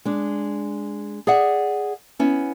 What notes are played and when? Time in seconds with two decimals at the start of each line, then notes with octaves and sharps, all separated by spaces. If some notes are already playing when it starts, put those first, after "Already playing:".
0.05 G#3 D4
1.27 G#4 D5 E5 F#5
2.19 B3 C#4 E4